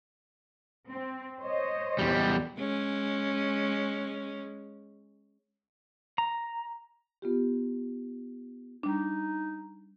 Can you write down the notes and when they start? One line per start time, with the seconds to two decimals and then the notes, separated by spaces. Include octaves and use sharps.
0.90 C4
1.41 C5 C#5 D#5
1.99 E2 G3
2.59 G#3 C#4
6.18 A#5
7.22 B3 F4 G4
8.83 G3 D4 D#4